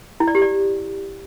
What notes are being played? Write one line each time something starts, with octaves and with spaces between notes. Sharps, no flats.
E4
D5
G4
D5